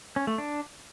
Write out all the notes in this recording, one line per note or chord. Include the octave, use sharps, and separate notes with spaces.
C#4
A3
D4